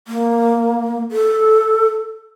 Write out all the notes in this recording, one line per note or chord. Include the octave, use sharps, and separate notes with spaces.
A#3
A4